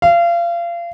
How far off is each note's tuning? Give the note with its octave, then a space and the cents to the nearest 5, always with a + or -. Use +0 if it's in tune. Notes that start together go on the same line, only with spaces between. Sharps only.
F5 -30